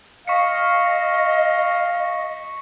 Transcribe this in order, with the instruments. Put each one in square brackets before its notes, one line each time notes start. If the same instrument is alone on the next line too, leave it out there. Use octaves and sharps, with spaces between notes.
[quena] D#5 [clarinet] F5 [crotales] C#6 B6 C#7